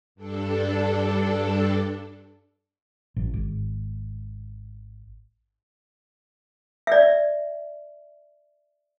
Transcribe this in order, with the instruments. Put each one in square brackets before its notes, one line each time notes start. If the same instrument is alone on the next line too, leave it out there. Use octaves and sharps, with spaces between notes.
[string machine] G2 D4 A4
[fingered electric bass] A1
G#1
[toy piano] D5 E5